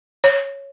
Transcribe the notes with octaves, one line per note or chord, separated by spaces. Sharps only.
C#5